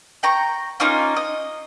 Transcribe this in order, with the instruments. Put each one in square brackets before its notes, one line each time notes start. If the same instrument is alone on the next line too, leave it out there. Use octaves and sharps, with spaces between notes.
[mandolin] G5 A#5 C#6
A#3 C#4 D#4 F4
D#5